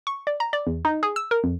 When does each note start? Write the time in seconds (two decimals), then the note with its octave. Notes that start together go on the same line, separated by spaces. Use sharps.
0.07 C#6
0.27 D5
0.40 A#5
0.53 D5
0.67 E2
0.85 D#4
1.03 G#4
1.16 E6
1.31 A#4
1.44 F2